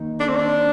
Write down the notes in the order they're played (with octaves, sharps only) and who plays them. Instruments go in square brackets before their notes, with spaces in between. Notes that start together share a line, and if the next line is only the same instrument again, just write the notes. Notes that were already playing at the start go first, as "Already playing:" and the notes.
Already playing: [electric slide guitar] D#3 A#3 D#4
[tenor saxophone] D4
C4
D4